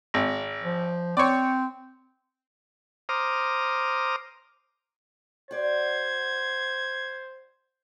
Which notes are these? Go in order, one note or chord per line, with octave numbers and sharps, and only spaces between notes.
G#1
F3
C4 C#5 D5
C5 A#5 D6 D#6 F6
F#4 C5 D5 G#6